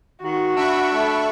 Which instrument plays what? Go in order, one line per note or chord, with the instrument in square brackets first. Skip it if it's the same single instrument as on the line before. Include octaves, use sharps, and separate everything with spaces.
[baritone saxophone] D#3 [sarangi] F#4
[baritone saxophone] D4 [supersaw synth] E5 B5 C#6
[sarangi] A3